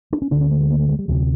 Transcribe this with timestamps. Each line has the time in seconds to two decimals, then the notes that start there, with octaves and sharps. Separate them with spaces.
0.13 D4
0.22 C#4
0.31 D2 D3 D4
0.41 C#4
0.51 A3
0.61 G#3
0.70 A#3
0.80 A3
0.89 G#3
0.99 G3
1.08 D2 C3 F#3